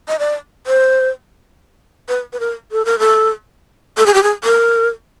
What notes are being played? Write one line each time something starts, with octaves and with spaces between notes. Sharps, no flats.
D#5
D5
C5
B4
B4
A#4
A4
A#4
A4
A4
G#4
G4
G#4
A#4